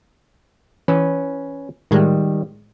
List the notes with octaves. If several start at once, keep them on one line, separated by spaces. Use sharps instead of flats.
E3 C#4 B4
A2 D#3 G3 G#3